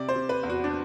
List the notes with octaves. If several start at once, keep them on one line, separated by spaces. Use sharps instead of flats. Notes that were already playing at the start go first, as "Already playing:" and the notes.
Already playing: C3 D5
C5
C3
B4
E2
F#4
D4